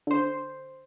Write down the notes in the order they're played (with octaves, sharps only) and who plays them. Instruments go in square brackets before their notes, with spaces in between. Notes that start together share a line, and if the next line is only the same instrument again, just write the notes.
[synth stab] D3 C5